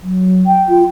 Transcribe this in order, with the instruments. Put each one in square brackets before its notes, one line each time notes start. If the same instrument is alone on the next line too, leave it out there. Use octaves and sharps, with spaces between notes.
[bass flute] F#3
[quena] G5
[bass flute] F4